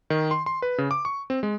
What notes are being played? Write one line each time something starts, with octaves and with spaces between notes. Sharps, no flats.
D#3
C6
C6
B4
C#3
D6
C#6
C4
G#3